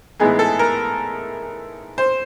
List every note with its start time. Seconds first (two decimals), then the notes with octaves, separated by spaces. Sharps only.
0.20 A2 E3 G#3 B3 D#4 G#4
0.39 A4
0.59 A#4
1.98 C5